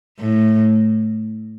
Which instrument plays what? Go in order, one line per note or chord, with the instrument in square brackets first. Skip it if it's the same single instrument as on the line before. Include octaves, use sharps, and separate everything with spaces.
[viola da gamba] A2